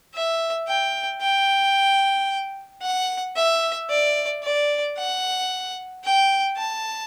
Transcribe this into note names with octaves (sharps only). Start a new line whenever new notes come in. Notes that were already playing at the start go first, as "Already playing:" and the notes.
E5
G5
G5
F#5
E5
D5
D5
F#5
G5
A5